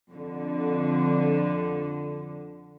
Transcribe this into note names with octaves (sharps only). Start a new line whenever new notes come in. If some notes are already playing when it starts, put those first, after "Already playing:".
F2 D3